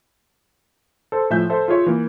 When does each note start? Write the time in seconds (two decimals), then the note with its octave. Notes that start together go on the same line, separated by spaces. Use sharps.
1.12 A4 C5
1.30 A2 F3 E5 G#5 G6
1.50 A4 C5 E5
1.68 F4 G#4 C#5 E5
1.86 E3 A#3